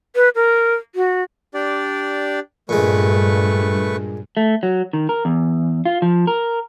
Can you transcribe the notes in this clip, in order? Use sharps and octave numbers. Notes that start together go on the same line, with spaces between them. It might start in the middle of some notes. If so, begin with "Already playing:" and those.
B4
A#4
F#4
D4 G4 D5
G2 A#2 G#3 A3 B4 C#6
A3
F#3
D#3
A#4
E2
F4
F3
A#4